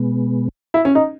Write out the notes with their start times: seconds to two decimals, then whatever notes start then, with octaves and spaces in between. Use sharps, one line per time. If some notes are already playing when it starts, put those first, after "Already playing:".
Already playing: B2 G#3 B3
0.74 E4
0.85 C#4
0.95 D#4